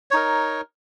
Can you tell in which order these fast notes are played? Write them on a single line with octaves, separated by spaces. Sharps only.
C#5 D#4 A#4